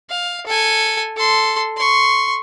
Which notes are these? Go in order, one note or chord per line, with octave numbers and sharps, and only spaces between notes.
F5
A4 G#5
A4 C6
C6 C#6